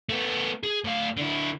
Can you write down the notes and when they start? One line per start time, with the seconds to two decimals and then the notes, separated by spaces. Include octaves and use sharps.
0.09 A3 B3
0.63 G#4
0.85 A2 F5
1.17 D3 E4